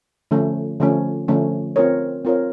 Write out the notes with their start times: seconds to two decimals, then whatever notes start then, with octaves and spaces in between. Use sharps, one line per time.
0.31 D3 F3 A3 C#4
0.80 D3 F3 A3 C#4
1.28 D3 F3 A3 C#4
1.76 C4 F4 A#4 C#5
2.25 C4 F4 A#4 C#5